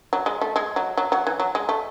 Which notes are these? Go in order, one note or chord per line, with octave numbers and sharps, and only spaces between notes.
F#3
G#3
A3
G#3
F#3
F#3
F#3
E3
F#3
G#3
A3